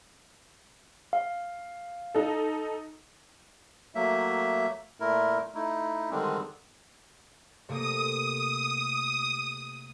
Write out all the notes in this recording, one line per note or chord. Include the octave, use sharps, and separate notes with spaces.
F5
D#4 A4
F#3 A3 A#3 E5
A#2 A3 E4 A#4
A3 D#4 E4
D3 D#3 G3 G#3 C4 D4
C3 A3 A#3 D#6